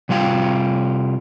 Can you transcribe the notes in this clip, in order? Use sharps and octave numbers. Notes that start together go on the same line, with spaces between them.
C3 G3 F4 F5 G5